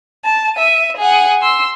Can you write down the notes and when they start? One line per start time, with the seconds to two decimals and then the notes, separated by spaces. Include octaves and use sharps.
0.25 A5
0.55 E5 D#7
0.97 G#4 F#5
1.42 C6 E6